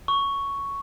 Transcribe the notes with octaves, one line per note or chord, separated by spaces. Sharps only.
C#6